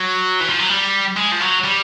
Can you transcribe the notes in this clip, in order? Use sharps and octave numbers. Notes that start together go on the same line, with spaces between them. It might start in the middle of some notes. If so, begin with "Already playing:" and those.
Already playing: F#3
E3
F3
F#3
G3
G#3
F3
F#3
G3